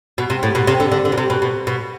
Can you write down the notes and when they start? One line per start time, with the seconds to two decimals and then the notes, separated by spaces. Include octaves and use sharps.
0.18 B2
0.30 C3
0.43 A2
0.55 B2
0.67 C3
0.80 D3
0.92 D3
1.05 D3
1.12 B2
1.18 C3
1.30 B2
1.42 B2
1.67 B2